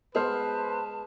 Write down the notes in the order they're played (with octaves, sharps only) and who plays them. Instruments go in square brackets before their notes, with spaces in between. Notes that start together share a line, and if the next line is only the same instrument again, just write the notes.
[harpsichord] G#3 [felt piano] B3 C5 F6 [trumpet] B4 [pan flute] A5